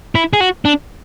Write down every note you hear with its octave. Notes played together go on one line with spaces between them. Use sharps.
E4
G#4
F#4
D4